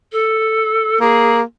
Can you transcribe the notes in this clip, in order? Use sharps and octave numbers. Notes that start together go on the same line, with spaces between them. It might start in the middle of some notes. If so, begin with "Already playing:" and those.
A4
A#3 G#4